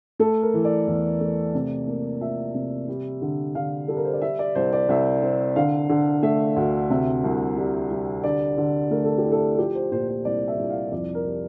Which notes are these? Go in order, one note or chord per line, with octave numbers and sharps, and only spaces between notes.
A3 A4
A#4
E3
D5
E2
A3
C3
A#3
F3 E5
C3
G3
D3
D3 F5
G3 A4
A#4
C5
D5
G3 E5
D5
C2 C5
D5
C2 E5
C4
D3 F5
D3
A3 E5
D2
C3 E5
C2
G3
G3
D3 D5
D3
A3 A#4
A4
G4
E4
A4
F3 G4
C5
A#2 C5
C5
C2 D5
E5
C2
F5
F2 D5
A#4
G3